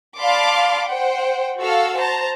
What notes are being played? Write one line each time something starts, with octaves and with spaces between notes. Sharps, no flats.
D5 F5 A5 B5 C6 D6
C5 F#5 G5
F#4 A4 F5 E6
C5 A5 A#5